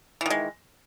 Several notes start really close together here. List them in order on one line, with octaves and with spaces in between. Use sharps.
E3 D#3 G#3